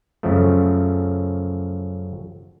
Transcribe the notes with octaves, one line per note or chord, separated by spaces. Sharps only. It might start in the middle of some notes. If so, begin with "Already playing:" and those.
F#2 C#3 F3 A3